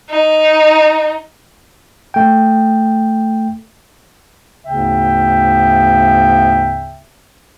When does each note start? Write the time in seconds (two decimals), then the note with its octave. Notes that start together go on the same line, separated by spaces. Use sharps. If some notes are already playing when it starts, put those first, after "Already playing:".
0.10 D#4
2.14 A3 G5
4.65 D2 G#2 C#3 B3 E5 G5